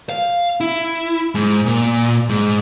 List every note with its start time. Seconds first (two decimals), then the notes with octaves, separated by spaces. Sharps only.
0.09 F5
0.61 E4
1.35 G#2
1.66 A#2
2.29 G#2